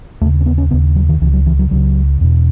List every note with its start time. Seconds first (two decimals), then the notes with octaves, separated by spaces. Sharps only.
0.21 D#2 A3
0.25 C#3
0.41 C#4
0.46 B3
0.58 C#4
0.70 D#2 C#3 B3
0.96 F#3
1.09 D#3
1.21 C#2 C#3 E3
1.33 F#3
1.46 E3
1.59 F#3
1.71 C#2 C#3 F#3
2.21 E2 B2